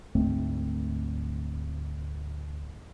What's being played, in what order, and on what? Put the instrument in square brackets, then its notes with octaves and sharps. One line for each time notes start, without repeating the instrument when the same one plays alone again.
[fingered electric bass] D2 G#2 A3 C4